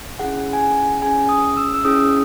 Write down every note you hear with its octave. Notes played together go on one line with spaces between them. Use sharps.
C#4 E4 G#4 F#5
G#5
F#5
C#4 E4 G#4 G#5
D#6
E6
E6
C#4 E4 G#4 D#6